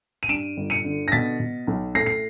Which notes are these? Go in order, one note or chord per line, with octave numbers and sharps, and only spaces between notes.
D#7
G2 D7 E7
G1
C#7 D#7
D3
A#6
B2 A6 B6
B2
B1
A2 A#6 C7
C7